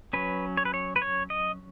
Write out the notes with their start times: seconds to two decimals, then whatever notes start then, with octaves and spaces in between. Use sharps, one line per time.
0.13 F#3 C#4 B4
0.57 C#5
0.65 B4
0.74 C#5
0.96 B4
1.02 C#5
1.30 D#5